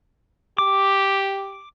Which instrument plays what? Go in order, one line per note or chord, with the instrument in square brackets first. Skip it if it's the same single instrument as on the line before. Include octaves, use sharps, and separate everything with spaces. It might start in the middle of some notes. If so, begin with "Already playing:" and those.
[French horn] G4 [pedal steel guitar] D6